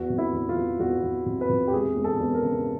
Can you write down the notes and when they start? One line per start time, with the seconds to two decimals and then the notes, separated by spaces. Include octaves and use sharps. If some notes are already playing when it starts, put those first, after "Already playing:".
Already playing: E2 F#4
0.10 C3
0.18 E4
0.33 E2
0.49 F4
0.56 E2
0.79 E2 F#4
1.03 E2
1.26 C3
1.41 B4
1.49 C3
1.68 G4
1.72 E1 G#4
1.96 E1
2.04 A4
2.19 E2
2.34 A#4
2.42 C#3